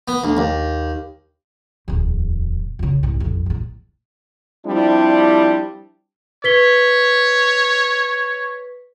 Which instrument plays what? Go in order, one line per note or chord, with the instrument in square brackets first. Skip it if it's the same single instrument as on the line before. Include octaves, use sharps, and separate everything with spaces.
[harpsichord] B3
D2
D#2
[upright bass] D1 E2
C#2 C#3
C2 G#2
A1 F2
E2 A2
[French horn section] F3 G3 C4 D4 E4
[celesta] B4 B6 G7 [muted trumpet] C#5